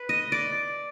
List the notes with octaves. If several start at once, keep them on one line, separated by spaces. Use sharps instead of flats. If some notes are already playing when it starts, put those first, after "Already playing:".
Already playing: B4
D#5
D5